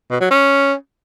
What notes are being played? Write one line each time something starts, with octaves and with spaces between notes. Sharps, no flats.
B2
F#3
C#4